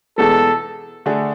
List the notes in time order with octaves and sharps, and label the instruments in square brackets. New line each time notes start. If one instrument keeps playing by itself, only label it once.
[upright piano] E2 B2 G#3 [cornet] A4
[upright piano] D3 A3 D4 G#4